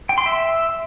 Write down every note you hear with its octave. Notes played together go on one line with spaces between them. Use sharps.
G5
C6
E5